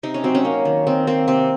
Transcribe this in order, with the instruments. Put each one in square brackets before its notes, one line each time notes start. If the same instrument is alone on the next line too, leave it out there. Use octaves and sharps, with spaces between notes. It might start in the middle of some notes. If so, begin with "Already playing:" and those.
[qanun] C3 D#4
C#4
F#3 C4
C#4
A#3
D#3
D#3 C4
A#3 C4
C3 C4